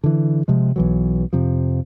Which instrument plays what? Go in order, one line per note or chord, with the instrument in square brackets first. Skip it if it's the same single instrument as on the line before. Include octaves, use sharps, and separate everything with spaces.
[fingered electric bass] D3 E3
C3 F3 G#3
B1 E3 F#3
F2 C3 F3